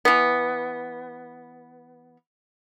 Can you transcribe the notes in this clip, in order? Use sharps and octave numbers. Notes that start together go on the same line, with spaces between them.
E3 B3